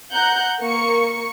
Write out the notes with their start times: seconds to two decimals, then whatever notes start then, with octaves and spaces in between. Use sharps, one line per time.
0.12 F#5 A#5 F#6 G6
0.61 A#3 C#6 C#7